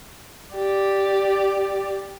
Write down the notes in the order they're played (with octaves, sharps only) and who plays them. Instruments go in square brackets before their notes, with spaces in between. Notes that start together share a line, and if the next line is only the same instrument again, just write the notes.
[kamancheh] G4 D5